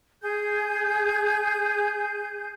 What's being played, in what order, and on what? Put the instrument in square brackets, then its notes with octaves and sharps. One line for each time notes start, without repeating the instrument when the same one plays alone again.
[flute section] G#4 G6